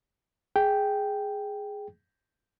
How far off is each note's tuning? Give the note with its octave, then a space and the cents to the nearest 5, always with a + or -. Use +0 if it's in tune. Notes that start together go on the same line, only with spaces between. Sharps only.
G#4 +0 G5 +0